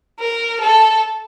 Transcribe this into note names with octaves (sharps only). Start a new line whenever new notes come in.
A#4
A4